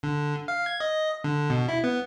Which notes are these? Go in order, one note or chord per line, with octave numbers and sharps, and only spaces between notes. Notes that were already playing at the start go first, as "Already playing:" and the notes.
D3
F5
G#6
D#5
D3
B2
E4
B3